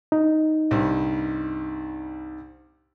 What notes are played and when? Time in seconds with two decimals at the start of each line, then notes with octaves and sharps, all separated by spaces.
0.12 D#4
0.71 C2 G2